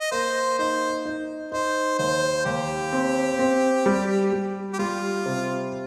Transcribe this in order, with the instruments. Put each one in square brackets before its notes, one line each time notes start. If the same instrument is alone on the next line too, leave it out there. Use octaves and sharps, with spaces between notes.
[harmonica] D#5
[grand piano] A#3 [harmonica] C5
[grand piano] D#4 [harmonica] C5
[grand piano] D#4
[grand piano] D#4 [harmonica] C5
[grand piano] D#2 [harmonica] C5
[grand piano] D#2 [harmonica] G4
[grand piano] C4
C4
G3
G3
[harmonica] G4
[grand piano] G3 [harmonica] F4
[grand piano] C3